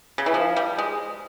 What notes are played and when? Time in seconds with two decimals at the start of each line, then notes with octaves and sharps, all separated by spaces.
0.18 C#3
0.26 E3
0.34 F3
0.56 G3
0.78 G#3